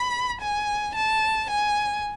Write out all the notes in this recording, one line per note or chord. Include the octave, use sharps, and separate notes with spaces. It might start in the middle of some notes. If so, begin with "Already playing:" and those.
Already playing: B5
G#5
A5
G#5